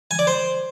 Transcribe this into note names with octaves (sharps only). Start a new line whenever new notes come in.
G#5
D5
C5